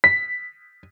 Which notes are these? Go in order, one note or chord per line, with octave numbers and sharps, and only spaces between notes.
B6